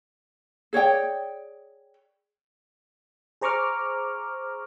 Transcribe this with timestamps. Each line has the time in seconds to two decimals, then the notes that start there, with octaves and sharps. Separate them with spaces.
0.73 G#4 C#5 D5 G5
3.41 G#4 C5 A#5 C#6 D6 F6